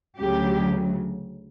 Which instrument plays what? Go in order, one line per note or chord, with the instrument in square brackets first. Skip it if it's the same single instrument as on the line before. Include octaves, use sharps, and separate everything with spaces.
[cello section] D2 C#3 F#3 G4